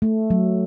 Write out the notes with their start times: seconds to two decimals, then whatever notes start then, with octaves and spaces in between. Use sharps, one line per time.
0.02 A3
0.30 F#3